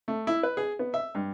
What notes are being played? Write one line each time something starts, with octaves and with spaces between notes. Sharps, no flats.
A3
E4
B4
G#4
B3
E5
G2